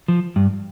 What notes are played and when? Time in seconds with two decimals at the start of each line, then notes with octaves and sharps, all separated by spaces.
0.08 F3
0.36 G2